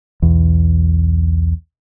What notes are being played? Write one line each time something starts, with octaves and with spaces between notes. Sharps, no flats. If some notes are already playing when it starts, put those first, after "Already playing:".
B1 E2